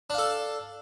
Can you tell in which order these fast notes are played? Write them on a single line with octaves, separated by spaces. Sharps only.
D4 F5 A4